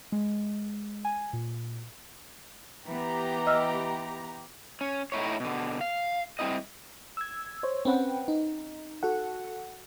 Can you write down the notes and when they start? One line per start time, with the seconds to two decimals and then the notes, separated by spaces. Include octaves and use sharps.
0.12 G#3
1.05 G#5
1.33 A#2
2.87 E3 B3 G4 A#5
3.46 D#5 E6 F6
4.81 C#4
5.12 A2 D#4 E4 C#5
5.40 B2 D3
5.81 F5
6.39 G3 G#3 C4 E4 D#5
7.17 E6 G#6
7.63 C5 C#5
7.85 C4 C#4 B4 F#5 G5
8.28 D#4
9.03 F#4 A4 F#5